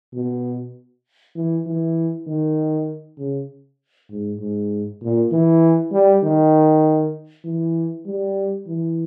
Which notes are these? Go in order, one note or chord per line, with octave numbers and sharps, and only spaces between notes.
B2
E3
E3
D#3
C#3
G#2
G#2
A#2
E3
G3
D#3
E3
G3
E3